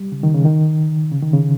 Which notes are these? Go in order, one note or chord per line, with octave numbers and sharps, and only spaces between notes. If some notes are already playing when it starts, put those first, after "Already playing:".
Already playing: G3
C#3
D#3
C#3
D#3
C#3
D#3
C#3